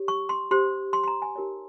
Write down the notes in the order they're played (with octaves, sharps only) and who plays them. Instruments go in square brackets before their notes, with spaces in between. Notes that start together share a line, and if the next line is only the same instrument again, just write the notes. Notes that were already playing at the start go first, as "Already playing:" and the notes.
Already playing: [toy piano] G4 C#5
C#6
C6
G4 C5 C6
C6
C6
A#5
G#5
D#4 G4 A#4 C#5